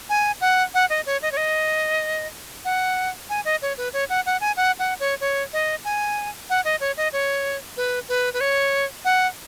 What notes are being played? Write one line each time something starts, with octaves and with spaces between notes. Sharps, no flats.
G#5
F#5
F#5
D#5
C#5
D#5
C#5
D#5
F#5
G#5
D#5
C#5
B4
C#5
F#5
F#5
G#5
F#5
F#5
C#5
C#5
D#5
G#5
F#5
D#5
C#5
D#5
C#5
B4
B4
B4
C#5
F#5